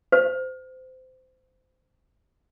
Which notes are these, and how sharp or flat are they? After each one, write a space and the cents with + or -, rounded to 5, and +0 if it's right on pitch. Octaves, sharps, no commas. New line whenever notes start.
C5 -25